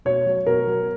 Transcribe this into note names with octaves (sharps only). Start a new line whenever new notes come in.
B2 C#5
F#3
B2 A#4
F#3